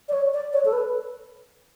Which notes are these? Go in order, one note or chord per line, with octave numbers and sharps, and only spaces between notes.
D5
C#5
D5
C#5
A4
B4